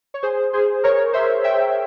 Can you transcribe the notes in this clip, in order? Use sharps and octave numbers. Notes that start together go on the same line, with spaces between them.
C#5
G#4 C5
G#4 C5
A#4 C#5
C5 E5
E5 G5